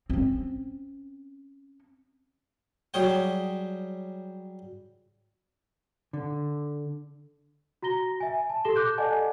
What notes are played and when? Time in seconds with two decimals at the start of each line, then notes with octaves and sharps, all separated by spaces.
0.10 C4 C#4
2.94 F#3 G3 G#4 C#5 G5
6.13 D3
7.83 F#4 A#5 A#6 G7
8.20 E5 G#5
8.50 A5
8.65 G4 A4 C6 A#6 E7 G7
8.76 D6 F#6 G6
8.98 A4 D5 D#5 F#5 G#5 A5